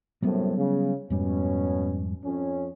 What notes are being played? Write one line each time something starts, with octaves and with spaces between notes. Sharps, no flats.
F#2 A2 C3 F#3 G3 B3
C#3
F2 G#2 B2 G3 C#4
F2 C#4